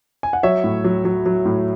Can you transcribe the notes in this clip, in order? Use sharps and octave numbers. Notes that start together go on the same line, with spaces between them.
G#5
F#5
F#3 C#5 E5
A2
F#3
F#3
F#3
A2